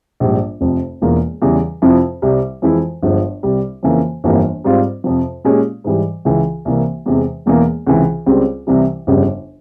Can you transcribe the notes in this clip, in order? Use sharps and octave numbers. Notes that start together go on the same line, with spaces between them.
A#1 G#2 G3
F1 F2 C3
E1 E2 E3 A#3 F4
E2 C#3 E3 G3
F2 C3 F3 C4 E4
C2 C3 G3
F2 E3 G#3 E4
G1 G2 F3 G#3
C2 C3 G3
F2 C#3 E3 A#3
G1 F2 E3 G3 A#3
G#2 G3 C4 F4
F2 C3 F3
A#2 G#3 C#4 G4
G#2 E3 G3
C#2 C#3 E3
C2 C3 E3 A#3
E2 C3 E3 G#3
E1 E2 E3 A#3
C#2 C3 E3
C#2 C#3 G3 C4
C2 C3 E3 G3
G1 F2 C#3 G3